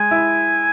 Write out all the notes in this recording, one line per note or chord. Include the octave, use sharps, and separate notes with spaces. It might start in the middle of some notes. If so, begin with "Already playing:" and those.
Already playing: G#3 G#5
E4